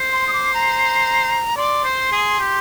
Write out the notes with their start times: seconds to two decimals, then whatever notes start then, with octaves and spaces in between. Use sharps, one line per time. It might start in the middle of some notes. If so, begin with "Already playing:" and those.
Already playing: C5
0.12 C6
0.28 D#6
0.33 D6
0.54 A#5
1.57 D5 C6
1.84 C5
2.12 G#4
2.39 G4